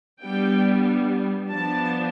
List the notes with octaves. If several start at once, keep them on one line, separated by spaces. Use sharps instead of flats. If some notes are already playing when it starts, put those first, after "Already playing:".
G3 B3 D4 G5
F3 B3 D4 A5